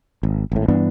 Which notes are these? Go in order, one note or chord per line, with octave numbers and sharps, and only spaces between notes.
G#1
G#1 A2
G2 E3 B3 D4